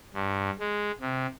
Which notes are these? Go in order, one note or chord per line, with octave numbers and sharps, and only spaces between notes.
G2
G#3
C3